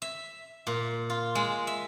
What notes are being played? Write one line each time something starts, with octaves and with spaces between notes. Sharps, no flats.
E5
A#2
F4
G#3
E5